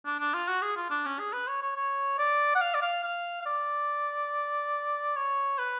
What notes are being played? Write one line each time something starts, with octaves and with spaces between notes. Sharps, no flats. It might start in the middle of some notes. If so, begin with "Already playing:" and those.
D4
D4
F4
F#4
G#4
F4
D4
C#4
G#4
B4
C#5
C#5
C#5
D5
F#5
F5
D5
F5
F5
F5
D5
C#5
B4